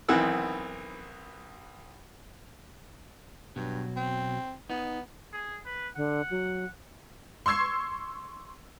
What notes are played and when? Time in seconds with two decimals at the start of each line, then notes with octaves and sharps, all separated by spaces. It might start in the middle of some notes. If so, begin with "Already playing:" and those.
0.09 B1 D#3 E3 C4 F#5 E6
3.56 G2 B2 F#3
3.96 C4
4.70 B3 D#4
5.33 G#4
5.66 B4
5.96 D3 F#5
6.30 F#3
7.46 C6 C#6 E6 G#6 C7